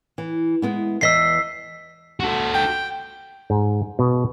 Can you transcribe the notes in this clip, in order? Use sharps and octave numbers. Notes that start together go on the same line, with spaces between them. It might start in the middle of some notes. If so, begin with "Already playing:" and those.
E3
G#3 B3 E4
E2 E3 D#5 E6 B6 C7
F#4 A4
G5
G#2
B2